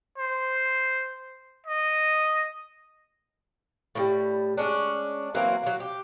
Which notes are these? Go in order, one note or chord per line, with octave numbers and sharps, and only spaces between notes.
C5
D#5
A2 F3 G3
G#3 C#4 D4
E3 F#3 A#3 C4
F#3 A#3
G4